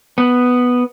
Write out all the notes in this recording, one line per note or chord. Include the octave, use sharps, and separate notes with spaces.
B3